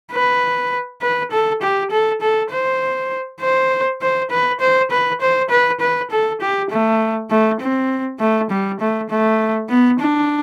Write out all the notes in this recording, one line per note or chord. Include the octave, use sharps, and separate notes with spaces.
B4
B4
A4
G4
A4
A4
C5
C5
C5
B4
C5
B4
C5
B4
B4
A4
G4
A3
A3
C4
A3
G3
A3
A3
B3
D4